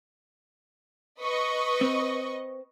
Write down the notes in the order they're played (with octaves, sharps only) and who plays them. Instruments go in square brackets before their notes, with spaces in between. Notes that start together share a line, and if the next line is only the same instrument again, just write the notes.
[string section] B4 D#5 C#6
[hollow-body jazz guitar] C4